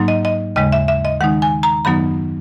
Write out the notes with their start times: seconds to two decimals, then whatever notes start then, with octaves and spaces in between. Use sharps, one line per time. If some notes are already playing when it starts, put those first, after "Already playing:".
Already playing: G#2 F#3 A#3 D#4
0.08 D#5
0.25 D#5
0.56 D#2 C#3 G#3 D#5
0.72 E5
0.88 E5
1.05 D#5
1.21 D#3 G#3 D#4 F#5
1.42 G#5
1.63 A#5
1.85 F#2 D#3 F#3 B3 D#4 B5